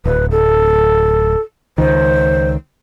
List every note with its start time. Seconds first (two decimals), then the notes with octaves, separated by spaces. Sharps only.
0.05 D1 B4
0.31 A4
1.78 C#2 D#3 C5